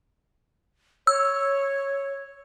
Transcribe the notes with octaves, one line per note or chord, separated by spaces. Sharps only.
C#5 E6